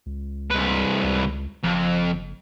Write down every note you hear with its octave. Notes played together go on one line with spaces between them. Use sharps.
C#2
C2 B4
C#2
F#1 F2